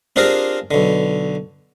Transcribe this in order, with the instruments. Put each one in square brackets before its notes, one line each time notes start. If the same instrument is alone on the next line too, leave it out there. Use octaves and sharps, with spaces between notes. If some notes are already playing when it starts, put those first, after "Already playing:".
[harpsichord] C4 D4 F4 G4 G#4 A#4
B1 D3